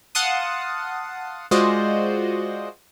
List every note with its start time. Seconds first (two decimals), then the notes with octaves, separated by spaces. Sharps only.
0.15 F5 F#5 A5 C6 D#6
1.51 G#3 F4 F#4 C5 D5 D#5